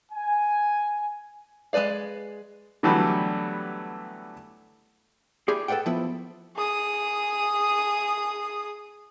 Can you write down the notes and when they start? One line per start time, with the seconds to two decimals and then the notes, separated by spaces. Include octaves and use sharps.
0.12 G#5
1.73 G#3 C#4 B4 D5 F5
2.83 D3 E3 F#3 G3 A3 B3
5.48 E4 G4 G#4 D5
5.68 A4 B4 D5 F#5 G5
5.86 F3 B3 E4
6.57 G#4 D#6